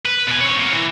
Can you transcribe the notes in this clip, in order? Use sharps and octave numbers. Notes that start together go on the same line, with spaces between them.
B4
B2 G#5
C4 C#5
A#3 B3
E3